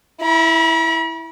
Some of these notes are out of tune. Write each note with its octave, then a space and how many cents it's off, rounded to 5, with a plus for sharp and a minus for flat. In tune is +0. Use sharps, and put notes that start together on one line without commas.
E4 -5 B5 -45